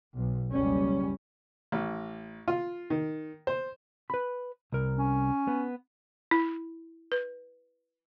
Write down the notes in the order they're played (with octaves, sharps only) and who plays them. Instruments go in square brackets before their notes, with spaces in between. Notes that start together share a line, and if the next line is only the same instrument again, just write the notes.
[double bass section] B1
F#1 C#2 G3 C#4
[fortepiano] A1
F4
D#3
C5
[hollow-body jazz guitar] B4 B5
C2 A#4
[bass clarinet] C#4
[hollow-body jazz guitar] B3
[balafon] E4
B4